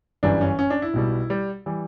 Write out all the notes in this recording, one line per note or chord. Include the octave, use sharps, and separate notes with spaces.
G1 F#2 E3 G3 D4
C#4
C#4
D4
E4
B1 B2 G3
G3
E3 G3